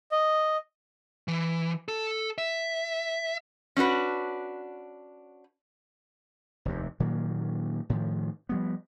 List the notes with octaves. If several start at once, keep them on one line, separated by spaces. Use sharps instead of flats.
D#5
E3
A4
E5
C#4 D4 F#4 B4
F1 D#2 C3
A#2 D#3 F#3 A#3
A2 D#3 F3
F3 G3 B3